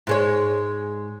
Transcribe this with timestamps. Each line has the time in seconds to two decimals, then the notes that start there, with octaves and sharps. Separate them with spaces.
0.07 G#2 G#3 C#5